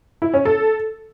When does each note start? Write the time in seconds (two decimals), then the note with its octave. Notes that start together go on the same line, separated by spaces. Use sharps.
0.22 E4
0.34 C#4
0.45 A4